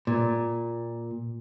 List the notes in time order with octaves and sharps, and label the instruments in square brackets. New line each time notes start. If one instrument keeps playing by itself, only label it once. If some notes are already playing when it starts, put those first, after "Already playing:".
[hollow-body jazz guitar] A#2